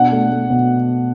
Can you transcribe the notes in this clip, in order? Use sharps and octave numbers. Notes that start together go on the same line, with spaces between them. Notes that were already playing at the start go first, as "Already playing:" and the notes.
Already playing: B2 D4 F#5
A3
A3
B2